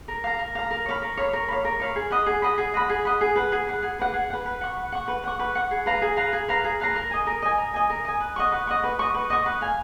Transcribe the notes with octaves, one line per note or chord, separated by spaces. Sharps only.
A#4
F5 A#5
A#4
F5 A#5
A#4
C#5 F5 B5
A#4
C#5 F5 B5
A#4
C#5 F5 B5
A#4
C#5 F5 B5
G#4
D#5 F#5 B5
G#4
D#5 F#5 B5
G#4
D#5 F#5 B5
G#4
D#5 F#5 B5
G#4
B4 F#5
G#4
B4 F#5
G#4
B4 F#5
G#4
B4 F#5
B4
F#5 C#6
B4
F#5 C#6
B4
F#5 C#6
B4
F#5 C#6
G#4
B4 F5 A#5
G#4
B4 F5 A#5
G#4
B4 F5 A#5
G#4
B4 F5 A#5
A#4
D#5 G#5
A#4
D#5 G#5
A#4
D#5 G#5
A#4
D#5 G#5
B4
D#5 F#5 C#6
B4
D#5 F#5 C#6
B4
D#5 F#5 C#6
B4
D#5 F#5 C#6
B4
F5 G#5